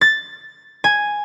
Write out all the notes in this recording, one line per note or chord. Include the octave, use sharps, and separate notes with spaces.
A6
G#5